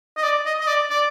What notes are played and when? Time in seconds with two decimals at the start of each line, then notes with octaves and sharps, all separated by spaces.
0.17 D#5
0.23 D5
0.46 D#5
0.61 D#5
0.67 D5
0.90 D5